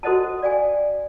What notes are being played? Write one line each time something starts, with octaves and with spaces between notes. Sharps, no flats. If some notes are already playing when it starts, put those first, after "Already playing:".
F#4 A4 C5 D#5 F#5 A5
D5 F5 G5 G#5